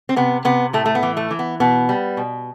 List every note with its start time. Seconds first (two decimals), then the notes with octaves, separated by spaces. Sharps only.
0.09 C4
0.16 C3 B3
0.45 C3 B3
0.73 A2 A3
0.86 A3
0.95 B3
1.03 E3
1.17 A3
1.31 E3
1.39 B3
1.60 B2 B3
1.89 G3
2.17 B2